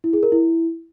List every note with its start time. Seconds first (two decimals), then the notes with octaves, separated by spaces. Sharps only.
0.04 E4
0.13 G#4
0.23 A#4
0.32 E4